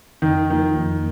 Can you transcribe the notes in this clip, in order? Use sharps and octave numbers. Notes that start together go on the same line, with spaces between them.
F2 D#3
D#3 F3 A#3
F2